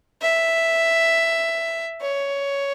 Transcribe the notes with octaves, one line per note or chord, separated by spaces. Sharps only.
E5
C#5